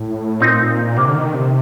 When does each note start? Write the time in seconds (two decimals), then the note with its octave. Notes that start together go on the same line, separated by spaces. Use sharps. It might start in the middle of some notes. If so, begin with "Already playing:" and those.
Already playing: A2
0.40 A#2 C4 D#4
0.96 C3 A#3 D4
1.08 D3
1.15 D#3
1.34 C3